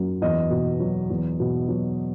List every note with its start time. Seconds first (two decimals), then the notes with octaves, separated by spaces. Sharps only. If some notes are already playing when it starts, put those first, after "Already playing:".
Already playing: F#2
0.22 E2 D#5
0.50 B2
0.80 F#3
1.10 E2
1.40 B2
1.68 F#3